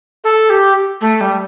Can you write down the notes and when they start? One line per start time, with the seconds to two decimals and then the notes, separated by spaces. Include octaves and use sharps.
0.24 A4
0.50 G4
1.01 A3
1.21 G3